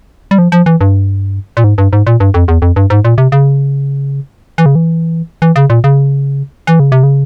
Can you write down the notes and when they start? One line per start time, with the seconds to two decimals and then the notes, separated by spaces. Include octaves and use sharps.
0.31 G3
0.38 F3
0.52 F3
0.66 E3
0.81 G2
1.57 A#2
1.64 G#2
1.78 G2
1.93 G#2
2.07 A#2
2.20 G2
2.34 F2
2.48 E2
2.62 F2
2.76 G2
2.90 G#2
3.05 A#2
3.18 C3
3.32 C#3
4.58 E3
4.66 C#3
4.75 E3
5.42 E3
5.56 C#3
5.70 A#2
5.84 C#3
6.67 E3
6.80 C#3
6.92 C3
7.03 C#3